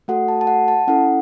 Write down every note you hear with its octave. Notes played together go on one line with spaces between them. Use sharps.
A3 F#4 A4 F#5
A5
A5
F#5
A5
C#4 E4 A4 F#5